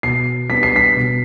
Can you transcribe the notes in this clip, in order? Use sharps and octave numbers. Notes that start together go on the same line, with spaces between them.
B2 C7
G3 B3 D4 B6
C7
B6
B2